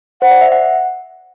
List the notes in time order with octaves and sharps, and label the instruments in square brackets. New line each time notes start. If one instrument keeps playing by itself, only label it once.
[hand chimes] C5 [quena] F#5
[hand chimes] D5
E5
F#5